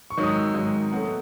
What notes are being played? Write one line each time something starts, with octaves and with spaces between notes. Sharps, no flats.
C#6
G#2 D#3 F#3
D#6
E6
G#2 D#3 F#3
B2 F#3 A3 F#5